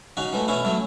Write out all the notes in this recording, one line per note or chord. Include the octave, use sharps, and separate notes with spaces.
C#3 D#4 F#4
E3 A3
B2 C#4 E4
F#3 A3